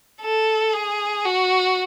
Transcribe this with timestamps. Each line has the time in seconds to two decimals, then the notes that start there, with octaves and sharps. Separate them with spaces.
0.22 A4
0.74 G#4
1.25 F#4